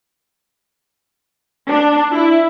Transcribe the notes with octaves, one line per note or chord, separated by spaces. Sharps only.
D4
E4